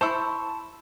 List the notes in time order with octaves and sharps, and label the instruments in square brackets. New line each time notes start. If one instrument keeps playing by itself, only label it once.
[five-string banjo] E4 C5 [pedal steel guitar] A5 C#6 E6